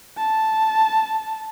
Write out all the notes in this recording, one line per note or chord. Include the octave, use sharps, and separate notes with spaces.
A5